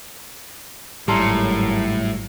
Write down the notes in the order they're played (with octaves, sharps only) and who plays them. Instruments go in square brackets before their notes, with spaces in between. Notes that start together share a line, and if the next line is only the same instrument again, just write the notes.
[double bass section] G#1 F#3 [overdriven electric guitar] A2 [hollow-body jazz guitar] G3 [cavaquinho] A4 A#4 C6